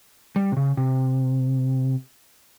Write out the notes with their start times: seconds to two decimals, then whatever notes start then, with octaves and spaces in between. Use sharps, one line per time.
0.36 G3
0.52 C3
0.57 C#3
0.77 C3